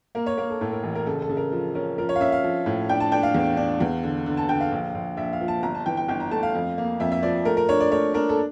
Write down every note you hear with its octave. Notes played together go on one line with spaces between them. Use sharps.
A#3 A#4
C#5
A#3 A#4
A4
A2 A4
A#4
A1
A#4
C#3 A4
A4
C#3
A#4
F3
C#4 A#4
F3 A#4
C#5
F5
C#4 E5
F5
F3
A2
D4 G5
A5
D4 G5
F5
E2
D4
E2
D3
D3
A5
D3 G5
F5
A#1
A#1
A#1 E5
F5
F3
A5
G1 A#5
A5
E3 G5
G5
G1 G5
A#5
A3 A5
F5
F2
A#3
F2 E5
E5
F3 D5
A3 A#4
A#4
D4 C#5
D5
A3 C#5
D4 A#4
A4